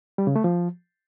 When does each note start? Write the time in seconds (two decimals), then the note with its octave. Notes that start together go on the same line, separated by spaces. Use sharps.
0.18 G3
0.27 C#3
0.36 A3
0.44 F3